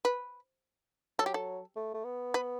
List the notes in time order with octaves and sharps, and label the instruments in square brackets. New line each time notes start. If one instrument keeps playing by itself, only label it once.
[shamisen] B4
[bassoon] F#3 [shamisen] A4
[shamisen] G4
A4
[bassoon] A3
A3
B3
[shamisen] B4